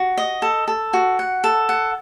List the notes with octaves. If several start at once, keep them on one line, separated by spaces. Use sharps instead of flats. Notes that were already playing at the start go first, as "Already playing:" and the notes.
Already playing: F#4
D#5
A4
A4
F#4
F#5
A4
F#5